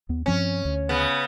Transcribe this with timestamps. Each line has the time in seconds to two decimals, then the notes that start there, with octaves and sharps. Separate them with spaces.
0.09 D#2 B3
0.26 G2 F3 C4 C#4
0.65 D2
0.89 C#3 B3